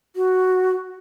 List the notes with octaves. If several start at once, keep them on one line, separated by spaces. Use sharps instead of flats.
F#4